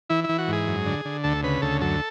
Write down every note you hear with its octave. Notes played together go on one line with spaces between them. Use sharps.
E3 E4
E3 E4
F#4
G#2 G#4
F#2
D3
D3
D2 A4
C#3 B4
D2 A4
F#2 A4